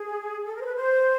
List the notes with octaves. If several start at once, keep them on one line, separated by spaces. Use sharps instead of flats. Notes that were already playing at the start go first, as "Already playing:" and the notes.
Already playing: G#4
A4
A#4
C5
B4
C5